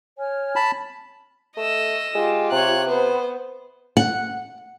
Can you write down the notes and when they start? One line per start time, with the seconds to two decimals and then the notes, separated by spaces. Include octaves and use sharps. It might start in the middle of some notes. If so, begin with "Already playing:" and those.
0.19 C#5 G#5 F6
0.56 A5 B5
1.57 A3 D#5 E6
2.15 G#3 F4 G4
2.52 C3 C#5 F#6
2.88 B3 B4 C5
3.97 F#5